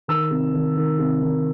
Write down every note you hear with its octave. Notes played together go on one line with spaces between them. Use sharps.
D#3 E6
C3
D#3
D#3
C3
D#3